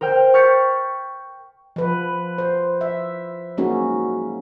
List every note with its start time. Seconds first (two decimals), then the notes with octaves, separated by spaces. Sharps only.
0.01 A#4 C5 G5 F6
0.34 C#6 F6 G6 A6 B6 C#7
1.76 F3 B4
2.38 C5
2.81 E5
3.57 F#3 G#3 A#3 C#4 D#4 F#4